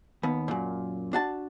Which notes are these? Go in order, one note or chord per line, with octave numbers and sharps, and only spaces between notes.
D#2 B3
F#2 A#2
D4 F#4 A5